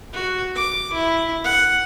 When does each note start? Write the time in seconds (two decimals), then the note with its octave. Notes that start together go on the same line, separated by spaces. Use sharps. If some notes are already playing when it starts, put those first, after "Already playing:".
0.13 F#4
0.55 D6
0.93 E4
1.44 F#5